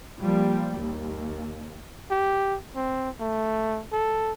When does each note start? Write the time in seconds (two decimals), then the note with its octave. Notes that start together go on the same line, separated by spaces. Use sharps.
0.19 F3 G3 A#3
0.78 D#2
2.11 G4
2.75 C4
3.20 A3
3.93 A4